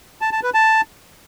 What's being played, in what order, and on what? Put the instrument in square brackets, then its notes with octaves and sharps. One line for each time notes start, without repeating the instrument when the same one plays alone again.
[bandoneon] A5
A5
B4
A5